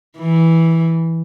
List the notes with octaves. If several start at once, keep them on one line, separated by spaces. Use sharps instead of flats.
E3